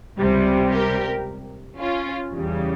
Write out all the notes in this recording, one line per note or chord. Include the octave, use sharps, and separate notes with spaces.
C#2 C3 G3
G4 A#4
C#4 F4
E2 C#3 G3